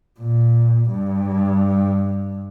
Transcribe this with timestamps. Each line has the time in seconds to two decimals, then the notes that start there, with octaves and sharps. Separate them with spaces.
0.20 A#2
0.90 G2